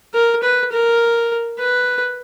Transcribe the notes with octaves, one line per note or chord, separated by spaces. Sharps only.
A#4
B4
A#4
B4